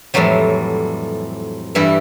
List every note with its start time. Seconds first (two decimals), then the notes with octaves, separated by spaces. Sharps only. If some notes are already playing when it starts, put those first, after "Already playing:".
0.14 F2 A2 E3 F#3 G3
1.75 G2 E3 G3 E4